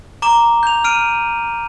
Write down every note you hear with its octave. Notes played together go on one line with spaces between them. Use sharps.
A#5 D6 E7 G7
G6 F7
F6 D7 D#7